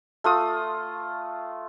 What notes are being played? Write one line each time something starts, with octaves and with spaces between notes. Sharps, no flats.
A3 F4 D#6